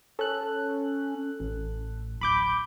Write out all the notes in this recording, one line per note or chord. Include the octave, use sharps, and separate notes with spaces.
C#4 A4 F#6
A1
D1 B5 D6 G6